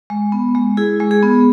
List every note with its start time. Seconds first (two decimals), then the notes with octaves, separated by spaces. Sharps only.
0.10 G#3
0.32 B3
0.55 G#3
0.77 E4 G#4
1.00 G#3
1.11 G#4
1.23 B3